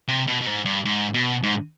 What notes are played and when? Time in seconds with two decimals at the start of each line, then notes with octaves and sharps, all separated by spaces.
0.08 C3
0.27 B2
0.41 B2
0.47 G#2
0.65 G2
0.85 G#2
1.14 B2
1.43 G#2